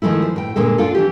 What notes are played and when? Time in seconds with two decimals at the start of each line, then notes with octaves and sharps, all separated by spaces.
0.02 D#3 F3 G#3 A3 E4
0.22 C5
0.36 A2 G5
0.56 A#2 D3 G#3 A4
0.78 D4 F4 A4
0.95 E3 D4 G4